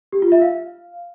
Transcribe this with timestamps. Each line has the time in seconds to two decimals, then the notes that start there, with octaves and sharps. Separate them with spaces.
0.12 G4
0.22 F4
0.32 E5
0.42 F5